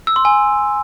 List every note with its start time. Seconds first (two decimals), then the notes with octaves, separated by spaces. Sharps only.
0.07 E6
0.16 C6
0.25 G#5